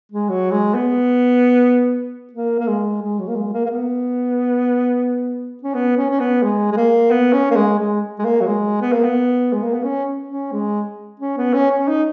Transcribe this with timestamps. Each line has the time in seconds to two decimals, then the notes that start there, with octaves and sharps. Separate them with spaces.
0.12 G#3
0.29 F#3
0.51 G#3
0.74 B3
2.33 A#3
2.59 A#3
2.68 G#3
3.02 G#3
3.19 F#3
3.28 A#3
3.35 G#3
3.53 A#3
3.66 A#3
3.69 B3
5.63 C#4
5.74 B3
5.97 C#4
6.10 C#4
6.20 B3
6.43 G#3
6.72 G#3
6.77 A#3
7.10 B3
7.33 C#4
7.51 A#3
7.56 G#3
7.79 G#3
8.19 G#3
8.25 A#3
8.41 F#3
8.47 G#3
8.81 B3
8.92 A#3
9.04 B3
9.53 G#3
9.63 A#3
9.73 B3
9.83 C#4
10.29 C#4
10.52 G#3
11.19 C#4
11.37 B3
11.54 C#4
11.71 C#4
11.88 D#4